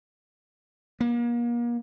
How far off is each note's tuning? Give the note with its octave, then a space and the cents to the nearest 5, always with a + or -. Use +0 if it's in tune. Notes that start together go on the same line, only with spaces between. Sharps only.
A#3 +35